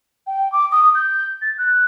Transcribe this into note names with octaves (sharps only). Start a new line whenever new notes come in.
G5
D6
D#6
G6
A6
F#6